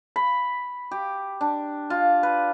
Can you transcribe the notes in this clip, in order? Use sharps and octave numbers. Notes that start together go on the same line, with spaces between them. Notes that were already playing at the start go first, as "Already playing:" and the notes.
B5
G4
D4
F4
B4